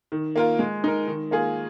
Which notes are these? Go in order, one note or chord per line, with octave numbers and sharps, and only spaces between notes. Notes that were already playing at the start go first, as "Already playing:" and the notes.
D#3
A#3 F4 A#4
G#3
D#4 A#4
D#3
A#3 F4 G#4